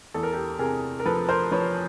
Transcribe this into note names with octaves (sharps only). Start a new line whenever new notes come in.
E2 A4
A#4
G4 A4
C3 G#4 A#4
A#4
F3 A4 B4
A#4 C5
F3 B4 C#5